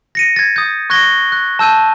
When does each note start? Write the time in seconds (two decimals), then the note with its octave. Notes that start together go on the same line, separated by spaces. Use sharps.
0.15 A#6 C#7 D#7
0.36 G#6 A6
0.56 D#6 G6
0.90 C#6 F#6 G#6 A#6 G7
1.32 F#6
1.59 A5 E6 G6 D#7